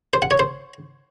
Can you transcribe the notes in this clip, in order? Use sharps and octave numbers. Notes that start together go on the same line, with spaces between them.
C5
F#5
C#5
C5